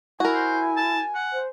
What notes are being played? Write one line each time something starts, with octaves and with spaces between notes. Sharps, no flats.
E4 F#4 A#4 G#5
C5
A5
F#5
C5